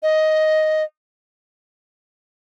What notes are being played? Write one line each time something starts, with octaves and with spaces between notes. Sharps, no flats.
D#5